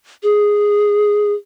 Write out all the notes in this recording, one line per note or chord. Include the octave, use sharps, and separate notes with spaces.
G#4